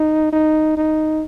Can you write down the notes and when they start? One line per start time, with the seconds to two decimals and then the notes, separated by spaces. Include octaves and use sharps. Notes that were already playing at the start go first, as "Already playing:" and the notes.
Already playing: D#4
0.32 D#4
0.77 D#4